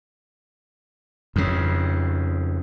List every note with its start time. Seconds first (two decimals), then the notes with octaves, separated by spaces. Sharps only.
1.36 F2 C#3